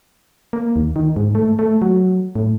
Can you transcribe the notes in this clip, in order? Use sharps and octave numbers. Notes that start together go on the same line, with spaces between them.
A#3
D#2
D#3
G#2
A3
A3
F#3
A2